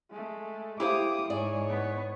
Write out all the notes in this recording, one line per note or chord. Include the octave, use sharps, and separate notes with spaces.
G#3 A3
E4 G4 C5 F5 D6 D#6
G#2 G#4 C#5 D5
B3